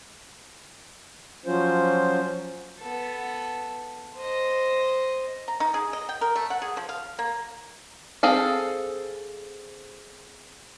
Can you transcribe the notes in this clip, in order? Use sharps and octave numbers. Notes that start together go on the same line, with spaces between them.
F3 F#3 C#4 F4 C5
B3 A4
C5 D#5
A#5
D#4
G#4
D#5
G5
A#4
A3
F#5
G#4
F3
F5
A#3
C4 G#4 A4 F5